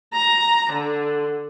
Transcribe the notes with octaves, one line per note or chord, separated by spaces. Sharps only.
A#5
D3